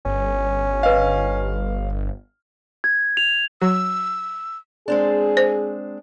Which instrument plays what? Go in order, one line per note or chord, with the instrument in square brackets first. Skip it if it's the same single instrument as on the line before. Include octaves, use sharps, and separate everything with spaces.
[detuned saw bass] G1 [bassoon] C#4
[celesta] B4 D#5 [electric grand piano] F5
[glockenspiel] G#6
F7
[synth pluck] F#3 [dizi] E6
[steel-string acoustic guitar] G#3 C4 D4 [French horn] G#4
[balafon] C5